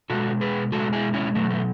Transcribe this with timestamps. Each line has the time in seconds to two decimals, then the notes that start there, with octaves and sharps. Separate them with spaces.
0.10 B2 G#3 F#4 A4
0.41 G#4 B4
0.72 B2 G#3 F#4 A4
0.93 E4 G#4
1.14 C#4 E4
1.35 B2 F#3 A3
1.50 A3